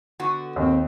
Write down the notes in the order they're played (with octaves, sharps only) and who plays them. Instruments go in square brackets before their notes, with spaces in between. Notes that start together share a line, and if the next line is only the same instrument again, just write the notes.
[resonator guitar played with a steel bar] D3 B3 F#4
[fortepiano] D#2 [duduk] C4